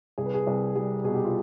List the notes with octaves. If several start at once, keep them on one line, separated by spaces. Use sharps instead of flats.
C2 G#4
B4
G#4
C2
G3 G#4
B2 G#4
G4
F4